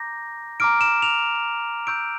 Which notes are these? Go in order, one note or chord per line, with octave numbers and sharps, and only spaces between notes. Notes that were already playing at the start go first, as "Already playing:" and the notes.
Already playing: A#5 D6 G6 A#6
A#5 D6 F6 D7
E7
F7
C#6 E6 G6 D7